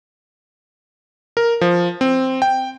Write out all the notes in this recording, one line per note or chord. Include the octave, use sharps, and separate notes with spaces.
A#4
F3
C4
G5